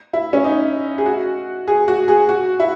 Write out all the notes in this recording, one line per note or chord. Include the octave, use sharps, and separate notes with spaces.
E4
C#4
D#4
G#4
F#4
G#4
F#4
G#4
F#4
E4